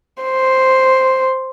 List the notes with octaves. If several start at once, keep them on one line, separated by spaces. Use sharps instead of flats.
C5